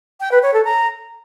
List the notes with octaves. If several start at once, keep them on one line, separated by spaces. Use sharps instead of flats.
G5
B4
C#5
A4
A#5